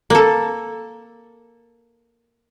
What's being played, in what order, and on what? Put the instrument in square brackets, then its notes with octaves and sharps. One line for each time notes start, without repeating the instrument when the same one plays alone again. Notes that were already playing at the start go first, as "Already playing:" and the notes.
[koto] A#3 A4